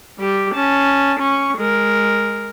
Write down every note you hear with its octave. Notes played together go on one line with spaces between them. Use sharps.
G3 G4
C#4 A5
C#4 C#6
G#3 A#4